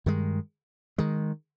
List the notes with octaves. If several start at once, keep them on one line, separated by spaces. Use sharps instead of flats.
G2 D#3 G#3
D#3 G#3